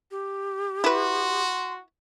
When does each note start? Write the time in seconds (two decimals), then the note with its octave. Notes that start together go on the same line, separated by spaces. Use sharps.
0.11 G4
0.84 E4 F#4 B4 C6